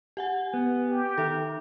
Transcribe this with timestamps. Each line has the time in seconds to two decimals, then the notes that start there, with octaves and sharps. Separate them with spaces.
0.17 G4 F#5 G#5
0.54 B3
0.89 G4
1.18 D#3 A4 E5